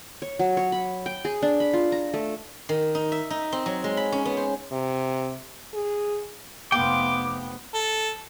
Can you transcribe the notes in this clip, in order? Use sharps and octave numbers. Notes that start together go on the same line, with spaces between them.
C#5
F#3
C#5
B5
G5
G#4
D4
B5
F4
A#5
A3
D#3
D#4
E5
D#4
C4
F#3
G#3
B5
C#4
B3
C5
C3
G#4
F1 B3 F5 G5 C6 D6
A4